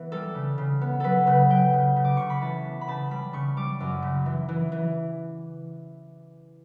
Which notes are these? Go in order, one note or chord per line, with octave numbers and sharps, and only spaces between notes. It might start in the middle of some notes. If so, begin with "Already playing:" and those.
Already playing: E3 B3 B4
G3 A4
C#3
C#3
B3
F#3 A4 B4
C#3 B4
F#3 G5
C#3
C#3
D6
C#3 C#6
B5
E3 A5
B3
B5
C#3 A5
G3 B5
C#3 C#6
G3 D6
F#2
C#3
E3
E3
E3